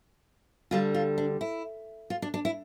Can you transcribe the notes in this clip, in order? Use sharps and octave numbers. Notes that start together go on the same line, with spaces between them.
D2 D3 G3 F4
F4
D4
E4
F4
D4
D4
E4